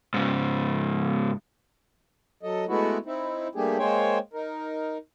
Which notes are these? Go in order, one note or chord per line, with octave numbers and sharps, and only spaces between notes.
G#2 C#3
F#3 A4 D#5
G#3 A3 B3 E4 F#4
C4 D#4 E4
G3 A3 A#3 D4 G4 G#4
G#3 A#3 G#4 C5 C#5 G5
D#4 A#4